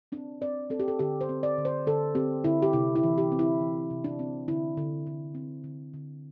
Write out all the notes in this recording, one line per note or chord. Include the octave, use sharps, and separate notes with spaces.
C4 D4
C4 D5
C4 A4
G4
A4
D3 G4
C5
C4
D5
D3
C5
D3 A4
C4 G4
D3 E4
G4
C3 E4
E4
E3
G4
C4
E4
E3
C3
D4
C4
D3 E4
D3
D3
C4
D3
D3